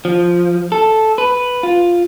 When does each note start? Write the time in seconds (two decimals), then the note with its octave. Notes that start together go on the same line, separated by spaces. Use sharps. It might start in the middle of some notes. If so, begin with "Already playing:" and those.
0.05 F3
0.72 A4
1.18 B4
1.63 F4